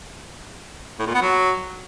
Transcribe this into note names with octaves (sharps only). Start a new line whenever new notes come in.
A2
A#2
B3
F#3